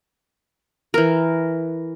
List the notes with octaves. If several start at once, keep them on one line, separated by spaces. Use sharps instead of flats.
E3 A#4